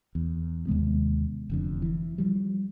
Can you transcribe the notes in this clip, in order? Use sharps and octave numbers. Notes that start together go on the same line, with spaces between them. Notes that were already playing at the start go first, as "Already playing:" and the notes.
E2
D#2 C3 G#3 B3
F1 F2 D3
E3
F3 G3